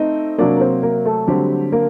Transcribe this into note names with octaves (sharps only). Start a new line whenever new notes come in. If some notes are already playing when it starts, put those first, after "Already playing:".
Already playing: A3 C4 D#4 D#5
C3 F#3 A#3 D4 D5
A#4
C4 C5
A#3 A#4
A3 A4
D3 F#3 G3 A3 C4 G4
A#3 A#4